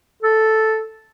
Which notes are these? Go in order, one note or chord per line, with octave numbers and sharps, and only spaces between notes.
A4